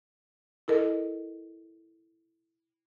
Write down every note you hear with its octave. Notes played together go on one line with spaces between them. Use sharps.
E4 A4 A#4 D#5